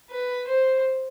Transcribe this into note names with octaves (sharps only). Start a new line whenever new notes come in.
B4
C5